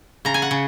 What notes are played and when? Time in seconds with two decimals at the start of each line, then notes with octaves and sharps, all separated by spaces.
0.25 C#3 A#5
0.34 G#5
0.42 F#5
0.51 C#3